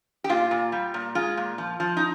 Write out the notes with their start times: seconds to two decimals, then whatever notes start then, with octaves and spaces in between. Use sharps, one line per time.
0.24 G4
0.29 A#2 F4
0.51 A#2
0.72 G3
0.94 A#2
1.15 G#3 F4
1.37 A#2
1.58 F3
1.80 F3
1.97 D#4